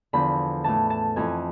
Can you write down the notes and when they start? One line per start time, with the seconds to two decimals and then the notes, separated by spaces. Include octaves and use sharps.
0.13 E2 D3 F3 B5
0.64 A2 E3 A5
0.90 A5
1.16 F2 E3 G#5